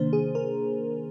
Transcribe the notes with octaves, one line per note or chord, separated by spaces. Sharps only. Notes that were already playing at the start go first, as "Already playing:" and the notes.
Already playing: C3 D#3 A#3 D4 C5
G#4
A#4